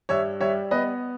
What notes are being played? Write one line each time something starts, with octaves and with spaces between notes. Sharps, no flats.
G2 C#5 E5
G3 C#5 E5
B3 B4 D#5